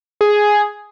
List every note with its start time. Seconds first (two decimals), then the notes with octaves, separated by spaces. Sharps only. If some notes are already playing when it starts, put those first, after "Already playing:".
0.21 G#4